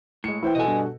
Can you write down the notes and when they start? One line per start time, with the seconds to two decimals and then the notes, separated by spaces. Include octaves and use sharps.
0.24 A2 G#3 C#7
0.43 E3 E4 C5 G5
0.55 B2 F#4 A4 D#5 G#5
0.67 G2